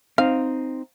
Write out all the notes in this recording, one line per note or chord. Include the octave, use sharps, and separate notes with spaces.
C4 D#4 F5